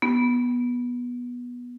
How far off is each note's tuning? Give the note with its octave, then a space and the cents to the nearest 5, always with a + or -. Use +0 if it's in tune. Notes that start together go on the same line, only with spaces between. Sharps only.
B3 -15